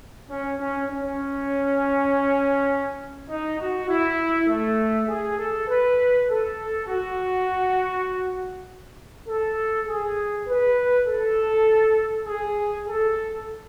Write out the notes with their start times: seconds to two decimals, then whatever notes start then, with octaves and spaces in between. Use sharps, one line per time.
0.29 C#4
0.58 C#4
0.89 C#4
3.29 D#4
3.58 F#4
3.88 E4
4.48 A3
5.08 G#4
5.38 A4
5.68 B4
6.29 A4
6.88 F#4
9.28 A4
9.88 G#4
10.48 B4
11.07 A4
12.27 G#4
12.87 A4